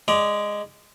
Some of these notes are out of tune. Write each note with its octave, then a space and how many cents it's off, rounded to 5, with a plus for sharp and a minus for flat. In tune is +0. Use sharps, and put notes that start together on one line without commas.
G#3 -5 D5 +0 A#5 +30